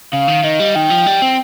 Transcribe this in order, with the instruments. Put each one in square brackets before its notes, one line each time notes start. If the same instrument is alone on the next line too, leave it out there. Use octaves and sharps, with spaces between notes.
[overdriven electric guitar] C#3 [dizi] F5
[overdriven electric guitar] D#3
[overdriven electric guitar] D#3 [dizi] D#5
[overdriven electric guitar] G3
[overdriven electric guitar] D#3 [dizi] G5
[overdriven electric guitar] F3
G3
C4